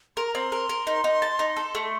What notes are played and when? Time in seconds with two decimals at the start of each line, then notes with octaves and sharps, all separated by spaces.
0.17 A#4 C6
0.26 A#5
0.35 C4 C6
0.52 A#4
0.69 A#4
0.87 D#4
1.04 D#4
1.22 A5
1.39 D#4
1.57 A4
1.75 A3